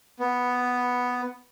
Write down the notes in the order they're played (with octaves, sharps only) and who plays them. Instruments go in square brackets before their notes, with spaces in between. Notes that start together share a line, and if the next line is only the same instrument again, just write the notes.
[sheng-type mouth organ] B3